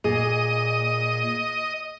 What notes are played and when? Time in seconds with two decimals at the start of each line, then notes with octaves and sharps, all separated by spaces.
0.04 A#2 G#4 D#5